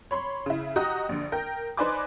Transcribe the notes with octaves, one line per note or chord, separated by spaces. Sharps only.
C#5 B5 C6
C#3 E4
F#4 G4 D#5 A#5 D#6
A#1 D3
A#4 G5
D#4 B4 C5 D5 G#5 D6